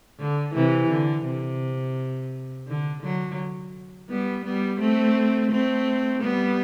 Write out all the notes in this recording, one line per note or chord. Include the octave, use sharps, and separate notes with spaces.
D3
C3 E3
D3
C3
D3
D3 F#3
G3 B3
G3 B3
A3 C4
A3 C4
G3 B3